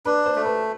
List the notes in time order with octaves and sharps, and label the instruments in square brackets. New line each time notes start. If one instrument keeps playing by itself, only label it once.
[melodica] D4 [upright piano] B4
[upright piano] C5
[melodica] A3
[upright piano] B4